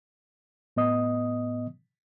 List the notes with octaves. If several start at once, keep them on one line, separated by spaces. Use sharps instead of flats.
A2 B3 D#5 D#6